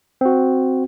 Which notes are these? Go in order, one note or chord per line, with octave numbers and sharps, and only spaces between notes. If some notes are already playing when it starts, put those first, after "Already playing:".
C4 F#4